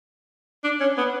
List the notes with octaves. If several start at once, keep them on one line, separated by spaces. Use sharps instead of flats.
D4
C#4
B3